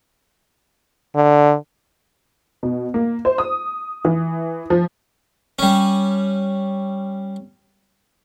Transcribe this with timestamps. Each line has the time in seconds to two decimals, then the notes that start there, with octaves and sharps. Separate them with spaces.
1.15 D3
2.63 B2
2.94 A#3
3.25 C5
3.38 D#6
4.05 E3
4.70 F3
5.59 G3 C#4